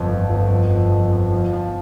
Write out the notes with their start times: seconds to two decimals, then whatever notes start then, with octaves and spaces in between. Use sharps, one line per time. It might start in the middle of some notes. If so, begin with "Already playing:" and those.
Already playing: G1 F2
0.08 F3
0.30 G1
0.50 F2
0.70 F2
0.91 F2
1.12 F2
1.32 F3
1.53 F3